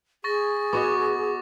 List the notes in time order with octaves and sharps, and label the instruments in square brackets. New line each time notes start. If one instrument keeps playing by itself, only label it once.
[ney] G#4 [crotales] C#6 A6 A#6
[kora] B3 F#4 D#5 [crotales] C#6 D6